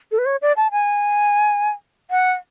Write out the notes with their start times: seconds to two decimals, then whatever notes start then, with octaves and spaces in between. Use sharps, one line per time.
0.12 A4
0.18 B4
0.26 C#5
0.42 D5
0.57 A5
0.72 G#5
2.11 F#5